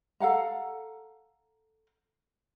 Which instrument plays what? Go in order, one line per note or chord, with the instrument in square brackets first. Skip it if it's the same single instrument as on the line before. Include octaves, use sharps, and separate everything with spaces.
[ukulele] A4 F5 F#5 A#5